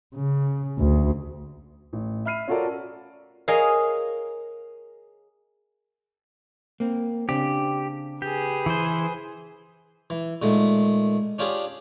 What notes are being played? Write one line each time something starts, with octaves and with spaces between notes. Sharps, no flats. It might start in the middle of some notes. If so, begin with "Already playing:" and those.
C#3
D2
A1
E5 B5 F6 C7 D#7
C#4 F4 F#4 A4 A#4 D5
G#4 A#4 C#5 D#5 F5
A#3 C4
C#3 C4 D4 G4
G4 G#4 B4
E3 C5
E3
A#2 D#3 G#3 A3
C#4 D4 F4 G4 G#4